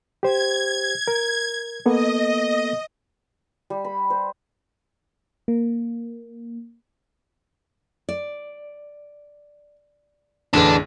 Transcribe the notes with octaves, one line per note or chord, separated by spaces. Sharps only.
G4 C5 G#6
A#4
A#3 B3 A4 D#5
G3
B5
C5
A#3
D5
A1 E2 D3 D4 G#4 B4